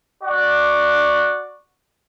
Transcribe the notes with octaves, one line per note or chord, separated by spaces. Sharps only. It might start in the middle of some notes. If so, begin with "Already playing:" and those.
F#4 D5